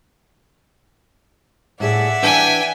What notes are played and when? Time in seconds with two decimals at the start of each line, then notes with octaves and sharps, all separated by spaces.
1.80 A2 G#4 D5 E5 F#5
2.22 E3 D4 G5 G#5